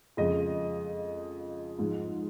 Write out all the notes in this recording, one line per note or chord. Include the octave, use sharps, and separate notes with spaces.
F2 C#3 G#3 D#5
G#2 F3 G#3